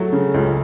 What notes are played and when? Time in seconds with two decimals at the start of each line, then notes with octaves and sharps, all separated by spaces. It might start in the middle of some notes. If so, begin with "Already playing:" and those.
Already playing: F#3 A3
0.13 C#3
0.34 C#2